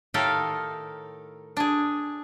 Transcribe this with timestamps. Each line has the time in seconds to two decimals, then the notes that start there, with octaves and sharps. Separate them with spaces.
0.14 A2 D#3 G4 A4 A#4 F5
1.57 D4 G#4